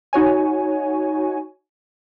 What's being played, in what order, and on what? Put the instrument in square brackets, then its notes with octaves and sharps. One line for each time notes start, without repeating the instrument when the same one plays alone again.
[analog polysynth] D#4 F#4 C#5 G#5